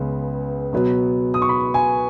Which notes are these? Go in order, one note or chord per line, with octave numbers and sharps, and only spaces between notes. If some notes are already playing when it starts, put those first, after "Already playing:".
Already playing: C#2 C#3 B3
B2 F#3 B3
D#6
C#6
B5
G#5